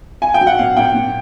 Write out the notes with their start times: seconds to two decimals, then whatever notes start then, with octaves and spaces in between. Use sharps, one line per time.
0.22 G#5
0.34 G5
0.41 F#3
0.47 F#5
0.58 A#2 F5
0.77 A#2 G5
0.94 A#2